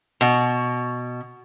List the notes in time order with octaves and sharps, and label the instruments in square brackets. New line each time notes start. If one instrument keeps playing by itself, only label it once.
[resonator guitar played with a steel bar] B2